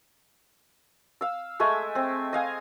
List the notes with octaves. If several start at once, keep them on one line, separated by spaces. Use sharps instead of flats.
F5 E6
G#3 A3 E5 G#5
C4
D#5 F5 G#5